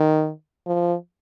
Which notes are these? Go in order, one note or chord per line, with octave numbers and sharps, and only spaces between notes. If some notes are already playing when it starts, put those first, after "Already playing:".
Already playing: D#3
F3